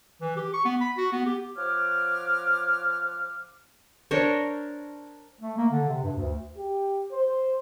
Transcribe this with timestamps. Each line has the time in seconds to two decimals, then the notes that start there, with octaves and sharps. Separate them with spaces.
0.21 E3
0.37 G4
0.54 C#6
0.65 B3
0.81 B5
0.97 F#4
1.13 B3
1.26 G4
1.57 F3 C#5 F#5 D6 F6
4.11 D4 A#4 C5 C#5
5.41 A3
5.58 A#3
5.71 D3
5.88 C3
6.04 G2
6.17 D2
6.57 G4
7.12 C5